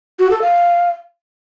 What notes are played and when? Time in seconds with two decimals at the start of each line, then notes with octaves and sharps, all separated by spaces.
0.19 F#4
0.31 A4
0.42 F5